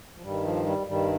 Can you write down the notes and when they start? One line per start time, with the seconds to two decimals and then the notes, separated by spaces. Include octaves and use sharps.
0.17 F3
0.22 G2 D#3 G3
0.44 F3
0.65 G3
0.87 G2 D#3 G3